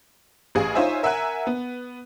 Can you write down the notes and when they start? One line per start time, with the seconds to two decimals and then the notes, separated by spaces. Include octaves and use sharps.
0.55 A1 G#4 F5
0.75 D#4 F4 C5 C#5 E5 G#5
1.03 A#4 E5 F#5 G#5 F#6
1.47 B3